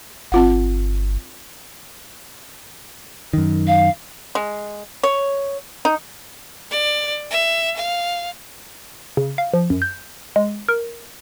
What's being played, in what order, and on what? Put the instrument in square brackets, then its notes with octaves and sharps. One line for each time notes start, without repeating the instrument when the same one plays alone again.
[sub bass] G1 [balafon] C4 F4 F#5
[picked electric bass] F#2 D#3
[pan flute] F5
[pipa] G#3
C#5
D#4
[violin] D5
E5
F5
[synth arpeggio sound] C#3
F5
F3
F#2
G6
G#3
A#4